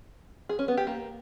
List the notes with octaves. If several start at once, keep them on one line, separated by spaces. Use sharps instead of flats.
G#4
C#4
B3
G4
A#3